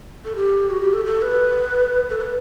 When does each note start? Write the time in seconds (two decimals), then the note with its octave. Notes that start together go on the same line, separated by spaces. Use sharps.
0.25 A4
0.35 G4
0.70 F#4
0.81 G4
0.94 A4
1.05 A4
1.22 B4
2.10 A4
2.21 B4